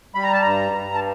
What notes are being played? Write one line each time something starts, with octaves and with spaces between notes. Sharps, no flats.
G3 B5
A#5
A5
G2 A#5
G2
A5